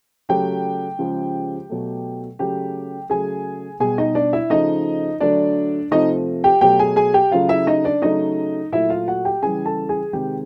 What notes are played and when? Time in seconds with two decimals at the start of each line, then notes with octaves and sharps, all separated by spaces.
0.29 C#3 F#3 A3 G4 G5
0.99 C#3 F3 G#3
1.70 B2 F#3 A3
2.39 C#3 F#3 A3 G4 G5
3.10 C#3 F#3 A3 G#4 G#5
3.80 B2 G3 G#4 G#5
3.98 D#4 D#5
4.15 D4 D5
4.33 E4 E5
4.50 C#3 F3 A3 D#4 D#5
5.20 D3 F#3 A3 D4 D5
5.91 C3 F3 A3 D#4 D#5
6.44 G4 G5
6.61 B2 F#3 A3 G4 G5
6.79 G#4 G#5
6.96 G#4 G#5
7.14 G4 G5
7.31 C#3 F#3 A3 F4 F5
7.49 E4 E5
7.67 D#4 D#5
7.84 D4 D5
8.02 C#3 F#3 A3 D#4 D#5
8.72 A#2 F#3 A3 E4 E5
8.90 F4 F5
9.08 F#4 F#5
9.25 G4 G5
9.42 C#3 E3 G3 G#4 G#5
9.66 A4 A5
9.89 G#4 G#5
10.13 C3 D#3 G#3 G4 G5